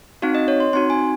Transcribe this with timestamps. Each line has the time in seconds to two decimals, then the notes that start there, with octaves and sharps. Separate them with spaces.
0.22 C4 D#4 F#4 F5
0.35 D#5
0.48 C#5
0.60 C6
0.73 C4 D#4 F#4 C6
0.90 G#5